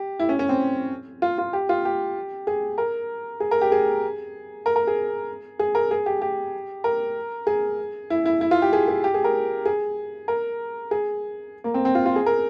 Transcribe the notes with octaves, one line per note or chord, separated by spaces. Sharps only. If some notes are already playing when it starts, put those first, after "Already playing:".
Already playing: G4
E4
C#4
C#4
C4
F4
F4
G4
F4
G4
G#4
A#4
G#4
A#4
G4
G#4
A#4
A#4
G#4
G#4
A#4
G#4
G4
G4
A#4
G#4
E4
E4
E4
F4
G4
G#4
G#4
G4
G#4
A#4
G#4
A#4
G#4
A#3
C4
C4
F4
F4
G#4
A#4